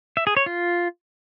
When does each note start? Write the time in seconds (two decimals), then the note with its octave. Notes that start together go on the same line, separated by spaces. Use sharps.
0.17 E5
0.27 G#4
0.37 C#5
0.46 F4